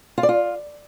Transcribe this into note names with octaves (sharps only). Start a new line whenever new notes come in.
F4
D5
F4